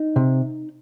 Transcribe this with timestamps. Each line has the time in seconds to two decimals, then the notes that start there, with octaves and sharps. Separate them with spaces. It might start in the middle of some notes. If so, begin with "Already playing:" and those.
Already playing: D#4
0.16 C3